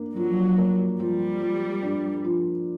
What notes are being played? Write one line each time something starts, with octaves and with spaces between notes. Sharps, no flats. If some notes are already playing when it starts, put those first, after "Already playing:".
Already playing: A#3 D4
F3 F#3
A#3
F3 G3
F3
D4
F3